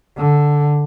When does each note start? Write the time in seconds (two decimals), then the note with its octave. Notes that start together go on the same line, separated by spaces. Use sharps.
0.17 D3